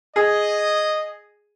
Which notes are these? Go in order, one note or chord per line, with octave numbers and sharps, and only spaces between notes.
G#4 D#5